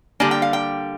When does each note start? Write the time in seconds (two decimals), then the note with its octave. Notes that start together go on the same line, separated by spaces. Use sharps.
0.20 D3 G3 A#3 D4 G#5
0.31 G5
0.42 F5
0.53 G5